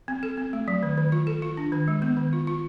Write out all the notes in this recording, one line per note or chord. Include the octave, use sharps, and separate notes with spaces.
C4
A4
C4
A3
F#3
D#3
D#3
F4
A4
F4
D4
D#3
G#3
B3
D#3
F4
F4